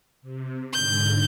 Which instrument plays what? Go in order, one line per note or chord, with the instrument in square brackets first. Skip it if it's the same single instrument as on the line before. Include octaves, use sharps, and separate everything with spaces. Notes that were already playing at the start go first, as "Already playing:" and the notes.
[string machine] C3
[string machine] G#2 D3 [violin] G6